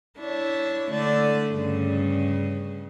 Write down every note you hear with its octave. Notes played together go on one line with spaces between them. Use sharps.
D4 E4 C#5
D3 A3 D5
G2 C#3